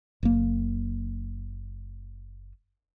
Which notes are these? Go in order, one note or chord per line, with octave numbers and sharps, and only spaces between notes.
F#1 A#3